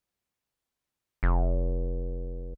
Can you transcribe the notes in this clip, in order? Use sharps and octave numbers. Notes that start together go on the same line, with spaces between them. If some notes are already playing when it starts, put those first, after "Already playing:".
F1